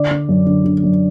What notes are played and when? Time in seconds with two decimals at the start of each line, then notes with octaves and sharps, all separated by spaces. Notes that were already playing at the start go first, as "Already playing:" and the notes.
Already playing: D3 D5
0.11 D3
0.29 F#2
0.46 D3
0.64 D3
0.84 F#2